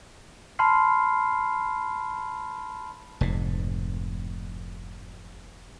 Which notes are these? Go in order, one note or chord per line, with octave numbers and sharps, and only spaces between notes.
A5 B5 C6 F6 C7
F1 G#2